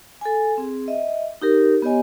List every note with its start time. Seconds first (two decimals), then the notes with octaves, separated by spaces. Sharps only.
0.21 A4 G#5
0.58 C4 G#4
0.88 D#5 E5
1.42 D#4 G4 A#4
1.82 B3 G4 C#5 D#5 G#5